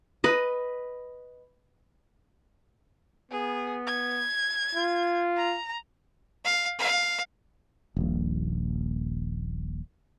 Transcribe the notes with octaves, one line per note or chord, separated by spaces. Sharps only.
B4 D#5
B3 G#4
G#6
F4
A#5
F5
F5
D#1 A#1